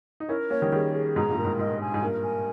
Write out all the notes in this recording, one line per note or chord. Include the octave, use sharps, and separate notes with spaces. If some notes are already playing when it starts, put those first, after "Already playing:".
D#4
C#4 E4 A#4
A#3 C#4 C#5
D#3 G3
D#3 G3 G#4
G#4
G#2 B2 A#5
G2 A#2
A#4
G#2
G#2 D#5
G#5
G#2
G2 A#2 A#4
G#5